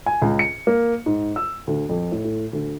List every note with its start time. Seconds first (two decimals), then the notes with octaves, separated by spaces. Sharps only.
0.06 G#5
0.22 C#2
0.39 C#7
0.67 A#3
1.06 G#2
1.36 E6
1.67 D2
1.89 F2
2.12 A2
2.24 A2
2.53 D2